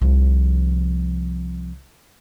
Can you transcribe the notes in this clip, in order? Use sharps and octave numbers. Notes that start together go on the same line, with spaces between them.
C2 F3